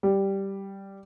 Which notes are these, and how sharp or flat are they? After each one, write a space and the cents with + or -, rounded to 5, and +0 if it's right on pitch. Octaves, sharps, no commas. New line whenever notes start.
G3 -5